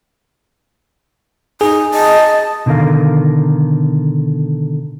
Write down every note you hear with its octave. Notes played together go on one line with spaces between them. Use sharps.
D#4 G#4
D#5 A5
B2 D3 D#3 A#4 F5